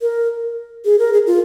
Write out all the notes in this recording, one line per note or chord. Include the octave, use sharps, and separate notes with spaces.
A#4
G#4
A#4
G#4
F4